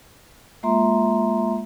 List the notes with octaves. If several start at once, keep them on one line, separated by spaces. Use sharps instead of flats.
G#3 A#3 F4 E5 A#5 C6